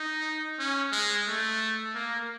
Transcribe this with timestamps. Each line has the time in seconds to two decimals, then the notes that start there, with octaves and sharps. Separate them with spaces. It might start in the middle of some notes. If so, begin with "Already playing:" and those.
Already playing: D#4
0.59 C#4
0.92 G#3
1.27 A3
1.95 A#3